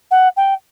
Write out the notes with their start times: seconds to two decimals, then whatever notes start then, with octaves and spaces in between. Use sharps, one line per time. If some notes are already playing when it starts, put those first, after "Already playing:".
0.11 F#5
0.37 G5